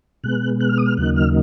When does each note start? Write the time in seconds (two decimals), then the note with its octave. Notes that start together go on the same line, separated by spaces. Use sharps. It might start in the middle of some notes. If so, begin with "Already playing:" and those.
0.24 B2 G#3 B3 F#6
0.61 F#6
0.69 F6
0.78 D#6
0.86 F6
0.97 D#2 C#3 F#3 A#3 D#4 F#6
1.16 F6